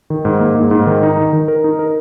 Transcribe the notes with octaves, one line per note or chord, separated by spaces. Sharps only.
D#3
G#2
A#3
G#2
G#2
D#3
D#4
D#3
D#3
A#4
D#4
A#4